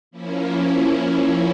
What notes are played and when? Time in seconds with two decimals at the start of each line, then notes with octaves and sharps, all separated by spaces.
0.11 F3 A#3 C#4 E4